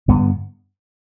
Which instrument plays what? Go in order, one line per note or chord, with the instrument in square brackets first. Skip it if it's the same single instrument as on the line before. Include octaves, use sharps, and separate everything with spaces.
[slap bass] G2 D3 B3